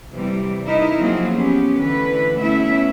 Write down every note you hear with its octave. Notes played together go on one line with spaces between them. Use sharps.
C3 E3 G3
D#4 E4 A#4 D#5
F3 F#3 A#3 C4 F4 G#4
B3 C#4 G4
D2 D3 E3 B4
A3 B3 C#4 E4 E5